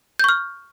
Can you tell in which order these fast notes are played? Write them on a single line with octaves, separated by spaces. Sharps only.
G6 C#6 F6